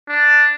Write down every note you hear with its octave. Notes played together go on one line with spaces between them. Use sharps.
D4